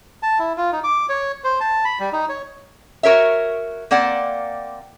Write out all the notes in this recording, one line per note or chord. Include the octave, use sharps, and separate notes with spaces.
A5
E4
F4
D#4
D6
C#5
C5
A5
B5
G3
D#4
C#5
F#4 A#4 C#5 E5
A#3 C4 D5 F#5